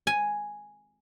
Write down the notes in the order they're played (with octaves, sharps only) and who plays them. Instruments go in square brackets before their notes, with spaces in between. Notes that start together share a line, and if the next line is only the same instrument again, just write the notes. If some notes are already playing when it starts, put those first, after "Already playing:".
[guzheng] G#5